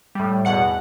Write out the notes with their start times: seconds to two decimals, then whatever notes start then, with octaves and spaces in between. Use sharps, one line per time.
0.15 A2 G3
0.45 E2 B2 F#5 C#7